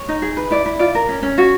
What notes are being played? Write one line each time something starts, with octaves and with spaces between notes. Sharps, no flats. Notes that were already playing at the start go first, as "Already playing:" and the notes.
Already playing: C#5
D#4
G#4
B4
E4 D5
E4
F4 D5
A#4
C#4
C#4
F#4